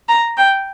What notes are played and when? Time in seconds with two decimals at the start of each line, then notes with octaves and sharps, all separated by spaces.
0.09 A#5
0.37 G5